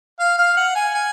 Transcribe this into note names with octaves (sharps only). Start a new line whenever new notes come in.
F5
F5
F#5
G#5
G#5